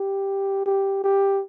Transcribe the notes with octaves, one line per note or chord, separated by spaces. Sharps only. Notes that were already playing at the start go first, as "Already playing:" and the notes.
Already playing: G4
G4
G4